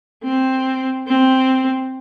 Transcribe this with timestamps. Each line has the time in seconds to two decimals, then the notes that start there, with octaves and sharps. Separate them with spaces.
0.23 C4
1.08 C4